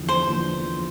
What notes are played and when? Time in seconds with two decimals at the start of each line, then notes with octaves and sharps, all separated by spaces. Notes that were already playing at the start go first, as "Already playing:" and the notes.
Already playing: E2 D3 F3
0.08 C5
0.26 E2 D3 F3